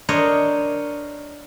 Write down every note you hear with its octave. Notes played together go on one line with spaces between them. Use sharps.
D4 A#4 C5 C#5 D#5